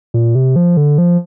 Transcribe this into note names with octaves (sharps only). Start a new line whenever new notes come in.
A#2
C3
F3
D3
F3